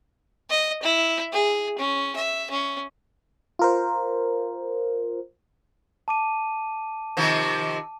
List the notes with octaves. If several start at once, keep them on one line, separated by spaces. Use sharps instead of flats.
D#5
E4
G#4
C#4
E5
C#4
F4 A#4 C5
A5 D6 D#7
C3 D#3 F3